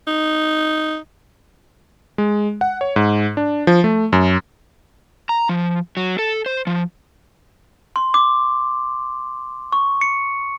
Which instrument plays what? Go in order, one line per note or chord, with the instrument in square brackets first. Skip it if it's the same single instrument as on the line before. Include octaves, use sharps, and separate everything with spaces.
[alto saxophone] D#4
[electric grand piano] G#3
F#5
C#5
G#2
D4
F3
A3
F#2
[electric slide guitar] A#5
F3
F#3
A4
C5
F3
[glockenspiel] C6
D6
C#6
C#7